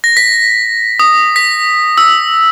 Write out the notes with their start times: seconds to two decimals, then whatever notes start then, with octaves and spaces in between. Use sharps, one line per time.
0.04 A#6
0.17 B6
0.99 D#6
1.36 B6
1.98 E6